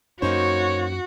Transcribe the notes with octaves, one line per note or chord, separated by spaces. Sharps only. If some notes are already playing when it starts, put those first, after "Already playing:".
F#2 A#3 C#4 D#4 F#4 C5 C#5